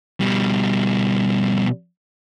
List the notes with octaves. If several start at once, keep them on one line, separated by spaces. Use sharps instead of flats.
B2 G3